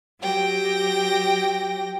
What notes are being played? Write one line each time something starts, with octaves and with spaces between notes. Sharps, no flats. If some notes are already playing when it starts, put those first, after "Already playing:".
F#3 G4 G5 A#6